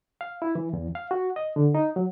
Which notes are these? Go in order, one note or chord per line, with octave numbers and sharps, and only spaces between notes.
F5
E4
E3
E2
F5
F#4
D#5
D3
D#4
F#3